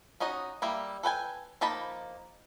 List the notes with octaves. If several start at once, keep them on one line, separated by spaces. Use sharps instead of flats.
C#4 D#4 F#4 D#5
G3 A#3 E4
A4 B4 G5 G#5
F3 A#3 D#4 A5 B5